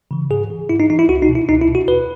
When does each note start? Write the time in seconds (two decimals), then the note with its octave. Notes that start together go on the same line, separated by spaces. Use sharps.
0.11 C#3 E3
0.30 G#2 G#4
0.50 E3
0.69 G#2 E4
0.80 D#4
0.90 E3 D#4
0.99 E4
1.08 C#2 F#4
1.22 D#4
1.28 B2
1.35 E4
1.48 C#2 D#4
1.61 E4
1.68 B2
1.75 F#4
1.88 D#2 B4